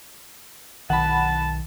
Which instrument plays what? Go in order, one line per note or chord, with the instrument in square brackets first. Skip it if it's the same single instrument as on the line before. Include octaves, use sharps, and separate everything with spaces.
[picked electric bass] B1 D#3 [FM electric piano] F#5 B5 [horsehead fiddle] A5